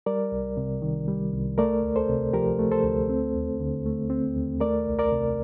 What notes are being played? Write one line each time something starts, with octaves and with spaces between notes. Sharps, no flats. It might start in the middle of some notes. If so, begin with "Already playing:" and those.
G3 A#4 D5
C2
C3
D#3
G3
C2
A3 A#4 D5
D2
A4 C5
C3
F3 G4 A#4
A3
A4 C5
D2
C4
D#2
D3
A3
C4
D#2
A3 A#4 D5
C2
A#4 D5
C3